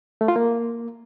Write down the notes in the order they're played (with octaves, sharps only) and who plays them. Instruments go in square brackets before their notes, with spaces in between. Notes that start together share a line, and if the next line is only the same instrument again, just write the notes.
[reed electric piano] A3
F4
A#3